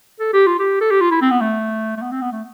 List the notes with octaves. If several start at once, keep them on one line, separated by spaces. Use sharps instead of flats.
A4
G4
F4
G4
A4
G4
F4
E4
C4
B3
A3
A3
B3
C4
B3
A3